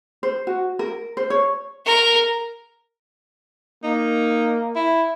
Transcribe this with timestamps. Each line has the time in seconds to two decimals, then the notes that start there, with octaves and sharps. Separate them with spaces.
0.23 C5
0.47 F#4
0.79 A#4
1.17 C5
1.30 C#5
1.86 A#4
3.84 A#3 D#4
4.76 E4